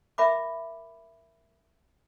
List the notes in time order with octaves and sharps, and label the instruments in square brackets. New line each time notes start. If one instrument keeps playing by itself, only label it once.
[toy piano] A#4 E5 B5 D6